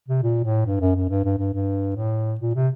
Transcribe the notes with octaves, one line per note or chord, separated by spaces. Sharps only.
C3
A#2
A2
G2
F#2
F#2
G2
G2
G2
G2
A2
A#2
C3